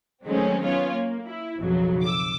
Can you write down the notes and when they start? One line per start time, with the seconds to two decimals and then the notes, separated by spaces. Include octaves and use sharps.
0.24 D#3 F#3 G#3 A3 C4 C#4
0.64 B3 C#4 F4 C#5
0.94 A#3
1.26 E4
1.60 B1 F2 C#3 F#3
2.03 D6 E6